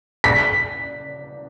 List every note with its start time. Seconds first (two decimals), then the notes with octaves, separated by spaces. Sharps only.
0.24 B6